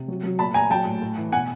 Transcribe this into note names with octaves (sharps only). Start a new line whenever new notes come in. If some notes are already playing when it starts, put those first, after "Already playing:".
Already playing: C3
F#3
F#3
A#2 A5 B5
A#2 G#5 A#5
F#3 G5 A5
A2
A2
E3
B2 F#5 G#5